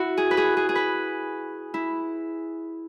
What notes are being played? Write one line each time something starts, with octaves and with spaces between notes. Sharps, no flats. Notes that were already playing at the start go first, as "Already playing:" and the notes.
Already playing: E4 F#4
G#4
B4
G#4
G#4
G#4
B4
E4